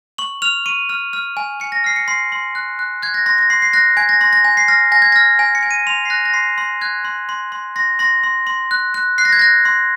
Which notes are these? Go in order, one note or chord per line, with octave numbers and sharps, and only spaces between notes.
C#6 F#7
F6 F7
C#6 D#7
F6
F6
G#5
G#5 C#7
A#6
F6 C7
C#7
C6 C7
C6
F#6
F#6
F#6 G#6
A#6
C6 A#6
A#6
C6 C7
C7
F#6 A#6
G#5 G#6
A#6
C6 A#6
A#6
G#5
C7
F6 A#6
G#5 A#6
G#6
F6 A#6
G#5
C#7
G#5
D#7
C6 F7
C7
F#6 A#6
A#6
C6 C7
C6
F#6 G#6
C6
C6
C6
C6 A#6
C6 A#6
C6
C6
F#6
F#6
F#6 C7
A#6
G#6
F#6 A#6
C6